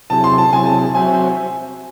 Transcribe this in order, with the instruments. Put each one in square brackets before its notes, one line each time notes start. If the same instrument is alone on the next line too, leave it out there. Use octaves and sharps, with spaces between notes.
[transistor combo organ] C3 F#3 C4 E4 G#4 [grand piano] A5
[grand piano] C6
A5
[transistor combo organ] C3 F#3 C4 E4 G#4 [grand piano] G#5
[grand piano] A5
[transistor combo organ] F#3 C4 F#4 C5 E5 [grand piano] G#5